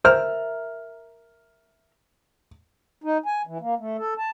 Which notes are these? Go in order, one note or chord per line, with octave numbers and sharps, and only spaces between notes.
A#4 C5 E5 A#5 F6
D#4
G#5
E3
A#3
A3
A4
A5